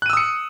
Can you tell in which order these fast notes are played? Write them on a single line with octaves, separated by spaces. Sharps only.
F#6 D#7 E6 D#6 C#7